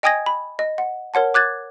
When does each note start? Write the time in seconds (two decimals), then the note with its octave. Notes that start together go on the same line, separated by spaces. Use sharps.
0.03 D#5 G5 G#5 D#6 G#6 A#6
0.26 B5
0.59 D#5
0.78 F#5
1.14 A#4 C#5 F#5 A5
1.34 D6 F#6 G#6 A6